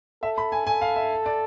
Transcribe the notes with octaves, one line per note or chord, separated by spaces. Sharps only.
A4 E5
B5
G#5
A4 G#5
F5
E5
D5